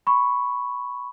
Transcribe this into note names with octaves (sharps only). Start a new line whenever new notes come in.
B5 C#6